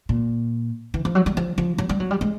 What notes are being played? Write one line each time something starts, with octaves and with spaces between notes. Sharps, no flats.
A#2
E3
F3
F#3
G3
F3
F3
F#3
G3
F#3
G3
G#3